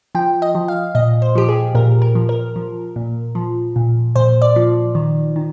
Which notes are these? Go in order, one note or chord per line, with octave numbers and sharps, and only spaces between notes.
F3 G5
D#5
F3
F5
A#2 D#5
C5
F3 G4
G#4
A#2 A#4
A#4
F3
A#4
F3
A#2
F3
A#2
A#2 C5
D5
F3
D#3
D#3